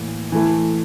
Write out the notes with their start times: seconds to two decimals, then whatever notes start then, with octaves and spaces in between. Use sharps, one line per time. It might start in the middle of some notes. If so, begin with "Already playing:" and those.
Already playing: A2 E3 A#3
0.32 E3 A3 E4